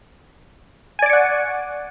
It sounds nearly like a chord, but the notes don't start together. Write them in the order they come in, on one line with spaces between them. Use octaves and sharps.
G#5 D5 D6 C#6 F#5